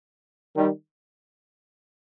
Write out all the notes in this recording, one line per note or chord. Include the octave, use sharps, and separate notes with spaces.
D#3 G3